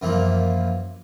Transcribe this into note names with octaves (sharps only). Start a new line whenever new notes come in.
F#2 E3 F3 A#3